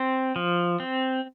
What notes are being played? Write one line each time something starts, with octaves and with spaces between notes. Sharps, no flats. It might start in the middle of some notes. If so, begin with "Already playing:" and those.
Already playing: C4
F3
C4